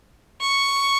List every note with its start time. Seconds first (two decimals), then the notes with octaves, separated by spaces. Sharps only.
0.41 C#6